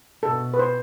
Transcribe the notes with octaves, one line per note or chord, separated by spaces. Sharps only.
B2 A4
B4
C5